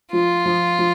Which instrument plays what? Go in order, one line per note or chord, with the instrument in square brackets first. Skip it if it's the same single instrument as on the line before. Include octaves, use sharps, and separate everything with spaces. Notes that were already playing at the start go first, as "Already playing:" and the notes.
[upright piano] F3 [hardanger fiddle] F4
[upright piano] F3
F3